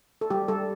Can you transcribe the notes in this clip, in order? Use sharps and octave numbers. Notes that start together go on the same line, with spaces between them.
A4
G3 G4
G3 A4